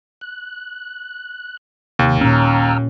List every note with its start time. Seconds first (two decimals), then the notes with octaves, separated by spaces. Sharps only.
0.21 F#6
1.99 D#2 C3 D#3
2.21 A#2 C#4 A#5 E6 F6